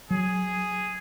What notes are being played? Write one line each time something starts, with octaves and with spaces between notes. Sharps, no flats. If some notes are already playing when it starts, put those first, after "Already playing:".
F#3 G#4